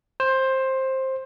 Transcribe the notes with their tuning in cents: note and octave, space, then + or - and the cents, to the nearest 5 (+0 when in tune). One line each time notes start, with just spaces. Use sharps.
C5 +15